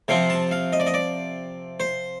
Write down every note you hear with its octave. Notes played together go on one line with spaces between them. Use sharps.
C3 F3 C4 F5
A5
F5
D#5
D5
D#5
D5
C5